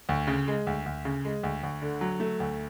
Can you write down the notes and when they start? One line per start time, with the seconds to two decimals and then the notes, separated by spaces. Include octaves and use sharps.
0.09 D2
0.27 C#3
0.48 G#3
0.67 D2
0.86 D2
1.05 C#3
1.25 G#3
1.43 D2
1.63 D2
1.82 D3
2.01 F#3
2.20 A3
2.40 D2